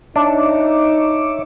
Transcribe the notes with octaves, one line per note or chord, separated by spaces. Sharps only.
D4 D#4 C#5 E5 D6